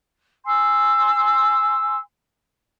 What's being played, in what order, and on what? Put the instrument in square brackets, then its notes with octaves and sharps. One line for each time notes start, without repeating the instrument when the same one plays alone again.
[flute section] G#5 C6 E6